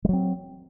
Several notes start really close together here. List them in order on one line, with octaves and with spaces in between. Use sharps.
G3 F#3 C4